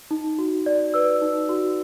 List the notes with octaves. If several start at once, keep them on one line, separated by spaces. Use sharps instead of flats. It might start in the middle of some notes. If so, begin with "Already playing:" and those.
D#4
F#4
D5
B4 E6
D#4
F#4